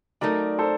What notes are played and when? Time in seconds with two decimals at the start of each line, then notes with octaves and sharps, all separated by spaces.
0.21 F#3 A3 D#4 A#4 D5
0.59 A4 C5